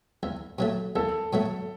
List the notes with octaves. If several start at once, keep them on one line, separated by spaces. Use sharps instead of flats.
E2
B2 F#3 A3
E2 A4
B2 F#3 A3